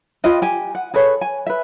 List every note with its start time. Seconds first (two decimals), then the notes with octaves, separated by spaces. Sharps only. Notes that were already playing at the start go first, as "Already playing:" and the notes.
0.24 F4 B4 D#5 G5
0.42 G4 G#5
0.75 F#5
0.94 G#4 A4 B4 C#5
1.21 G#5
1.46 B4 E5